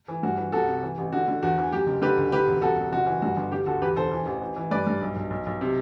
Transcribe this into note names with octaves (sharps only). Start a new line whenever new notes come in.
E3
G2 F#4
E3
C2 F#4 A4
C3
E3
A1
D3 F#4
D3
E2 F#4
E3
F#2 G4
F#1
D3 G4 B4
D2
D3 G4 B4
E1
C2 F#4 A4
C2
F#1 F#4
E3
G2 F#4
G1
D3 G4
D2 F#4 A4
E2 G4 B4
E1 A4 C5
E3
A1
E3
E3
G2 B4 D5
G2
B1
B1
B1
B1
C3